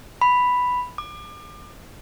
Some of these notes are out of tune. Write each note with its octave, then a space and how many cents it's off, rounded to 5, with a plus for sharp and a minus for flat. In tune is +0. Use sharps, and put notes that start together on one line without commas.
B5 +0
D6 +35